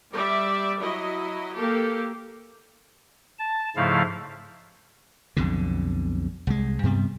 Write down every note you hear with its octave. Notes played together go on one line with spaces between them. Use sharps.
G3 D5 E5
F#3 E4 D#5
A#3 G4 A4
A5
G#2 C#3 F3 A3 E4 F5
B1 F2 B2 D3
C2 G#3
G2 C3 G3 B3